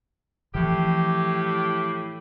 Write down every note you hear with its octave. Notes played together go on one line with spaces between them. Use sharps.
A2 E3 F3 G4